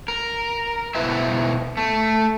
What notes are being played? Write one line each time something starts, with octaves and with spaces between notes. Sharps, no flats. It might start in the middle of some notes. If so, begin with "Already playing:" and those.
A#4
B2 E4 B4 C5 E5
A3